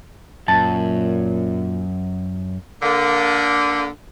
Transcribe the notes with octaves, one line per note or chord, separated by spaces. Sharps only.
F#2 A#2 A5
D3 A#3